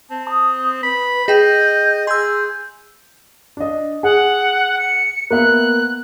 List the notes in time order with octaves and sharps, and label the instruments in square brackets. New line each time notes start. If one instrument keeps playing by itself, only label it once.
[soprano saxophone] C4 [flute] A5
[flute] D#6
[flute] B4 [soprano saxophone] B5
[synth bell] G#4 G5 [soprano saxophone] D#5 [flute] G6
[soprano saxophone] G#4 [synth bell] C6 E6 [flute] G6
[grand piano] D4 D#5
[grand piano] G#4 [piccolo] F#5
[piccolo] C#7
[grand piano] A#3 B3 E5 [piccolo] F#6